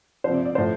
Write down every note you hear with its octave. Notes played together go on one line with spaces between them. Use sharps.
F3 C5
C3 D5
D5
A2 F3 C5